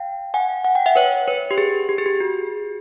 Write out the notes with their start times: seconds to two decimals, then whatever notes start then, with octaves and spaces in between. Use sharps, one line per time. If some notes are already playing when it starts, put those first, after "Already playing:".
Already playing: F5 G5
0.34 F#5 G#5
0.65 F#5
0.75 G5
0.86 E5 F#5
0.96 B4 C#5
1.28 B4 C#5
1.51 G4
1.58 G#4
1.89 G4
1.98 G#4
2.06 G4
2.20 F#4